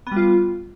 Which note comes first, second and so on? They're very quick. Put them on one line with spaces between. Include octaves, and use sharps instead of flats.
B3 G3 F4